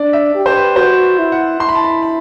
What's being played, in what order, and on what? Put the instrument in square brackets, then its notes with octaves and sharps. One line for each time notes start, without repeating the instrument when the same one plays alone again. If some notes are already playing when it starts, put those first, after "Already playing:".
Already playing: [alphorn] D4 [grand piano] D5
[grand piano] E5
[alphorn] G4
[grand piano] C5
B4
[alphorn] F#4 [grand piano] C5
[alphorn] E4
[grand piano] F#5
[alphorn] E4 [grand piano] C6
[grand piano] B5
A5
B5
B5